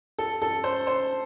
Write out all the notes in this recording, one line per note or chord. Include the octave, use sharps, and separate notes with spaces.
A4
A4
C5
C5